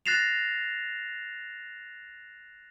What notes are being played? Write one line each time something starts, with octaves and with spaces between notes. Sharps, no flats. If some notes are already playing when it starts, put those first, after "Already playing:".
F#6 A6 A#6 C7 E7 F7